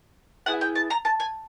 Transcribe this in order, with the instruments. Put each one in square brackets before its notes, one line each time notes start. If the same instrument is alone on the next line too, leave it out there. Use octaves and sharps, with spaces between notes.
[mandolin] B3 E4 G#4 F#5
G5
A5
A#5
A5
G#5